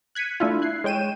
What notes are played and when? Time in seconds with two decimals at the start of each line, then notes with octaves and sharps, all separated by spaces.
0.15 F#6 G#6 B6 C#7 D#7
0.40 A3 D4 E4 F4
0.62 F#6 G#6 C7
0.84 G#3 C#5 G5 D#7 E7